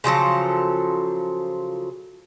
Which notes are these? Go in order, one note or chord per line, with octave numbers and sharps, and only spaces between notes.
C#3 F3 F#3 A4